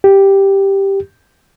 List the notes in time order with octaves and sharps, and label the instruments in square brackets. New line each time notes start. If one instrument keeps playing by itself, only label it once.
[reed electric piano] G4